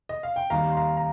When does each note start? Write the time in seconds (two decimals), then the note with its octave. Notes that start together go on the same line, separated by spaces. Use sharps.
0.09 D#5
0.23 F5
0.36 G5
0.50 D#2 D#3 G3 F5 A#5
0.72 C6
0.77 F5 A#5
0.97 A#5